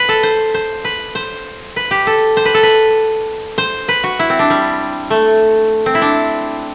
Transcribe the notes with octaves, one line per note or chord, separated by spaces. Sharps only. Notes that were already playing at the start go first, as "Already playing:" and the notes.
Already playing: B4
A4
C5
C5
B4
C5
B4
G4
A4
C5
B4
A4
B4
C5
B4
F#4
E4
C4
D4
G3
A3
C4
E4
D4